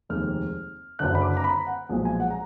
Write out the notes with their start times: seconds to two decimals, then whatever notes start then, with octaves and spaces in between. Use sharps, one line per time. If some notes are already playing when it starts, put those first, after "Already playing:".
0.09 F1 D#2 D#3 G#3 F6
0.99 F#1 F#2 D3 F#6
1.15 B5
1.22 D6
1.37 A#5
1.44 B5
1.67 F#5
1.89 B1 A#2 F3 G#3
2.05 G#5
2.20 F#5
2.30 A#5